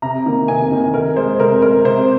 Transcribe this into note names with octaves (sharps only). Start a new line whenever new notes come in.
C3 A#5
D#3 A#3
C3 G#5
D#3 A#3
C3 A#4
G#3 C5
C3 A#4
G#3 A#4
C3 C5